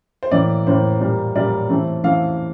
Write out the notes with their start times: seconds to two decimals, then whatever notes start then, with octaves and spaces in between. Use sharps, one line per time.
0.23 C5
0.31 A2 E3 A#3 D5
0.67 A2 E3 A#3 C5
1.00 A#2 G3 A#3
1.35 A#2 G3 A#3 D5
1.69 E3 A3 C4
2.04 E3 A3 C4 F5